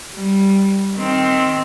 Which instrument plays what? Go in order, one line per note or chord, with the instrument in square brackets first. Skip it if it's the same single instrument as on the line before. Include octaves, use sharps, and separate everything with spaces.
[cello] G3
D#3 C4